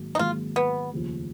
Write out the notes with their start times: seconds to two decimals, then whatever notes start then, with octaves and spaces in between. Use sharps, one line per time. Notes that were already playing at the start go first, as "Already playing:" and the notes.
Already playing: G#1 G#2 F#3 A#3
0.15 D#4
0.19 G#1 G#2 F#3 A#3 F4
0.56 B3
0.92 F1 D#2 C#3 F3